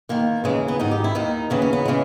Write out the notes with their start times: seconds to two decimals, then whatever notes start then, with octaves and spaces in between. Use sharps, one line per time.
0.09 E2 D#3 A#3
0.44 D#2 C#3 E3 G#3
0.68 B3
0.79 G#2 D#3 D#4
0.91 G4
1.04 E4
1.15 D#2 D#3 D#4
1.50 D#2 C#3 E3 B3
1.62 C#4
1.73 B3
1.85 C#3 E3 G#3